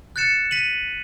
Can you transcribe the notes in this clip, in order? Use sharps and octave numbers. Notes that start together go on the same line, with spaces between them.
F#6 G6 A6 C#7 E7
B6 D#7 F#7